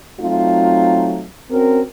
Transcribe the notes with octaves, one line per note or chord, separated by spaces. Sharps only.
F#3 A3 C4 D#4 F4
C4 C#4 F#4 A#4